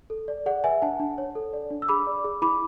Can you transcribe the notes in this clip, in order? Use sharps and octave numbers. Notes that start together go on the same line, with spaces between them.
A4
D5
G#4 D5 F#5
B4 E5 G#5
D4 F#5 A5
D4
C#5
A4
D5
D4
E6
G#4 B5 D6
D5
G#4
E4 B5 D6